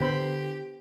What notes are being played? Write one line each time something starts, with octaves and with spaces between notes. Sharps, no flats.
D3 B3 G4 C5 B5